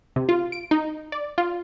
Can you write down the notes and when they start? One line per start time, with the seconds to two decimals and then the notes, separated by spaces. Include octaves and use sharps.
0.16 C3
0.29 F4
0.52 D7
0.71 D#4
1.12 D5
1.38 F4